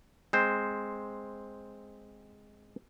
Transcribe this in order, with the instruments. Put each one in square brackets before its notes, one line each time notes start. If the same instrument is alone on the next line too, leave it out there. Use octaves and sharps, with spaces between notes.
[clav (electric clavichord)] G#3 C4 C5